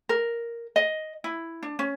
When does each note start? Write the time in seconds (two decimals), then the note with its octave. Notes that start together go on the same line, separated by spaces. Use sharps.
0.09 A#4
0.76 D#5
1.24 E4
1.63 D4
1.79 C#4